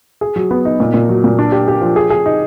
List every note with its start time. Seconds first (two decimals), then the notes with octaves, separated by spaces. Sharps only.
0.21 G#4
0.36 F#3
0.51 B3
0.65 D#4
0.80 A#2
0.94 A#2
1.09 F#3
1.24 A#2
1.39 D4
1.52 G4
1.68 G4
1.81 F3
1.96 G#4
2.10 G#4
2.26 D#4